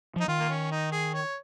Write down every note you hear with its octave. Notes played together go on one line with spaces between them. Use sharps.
F3 D#4
D#3 F4
A#3
C#4
D#4
G#4
C#5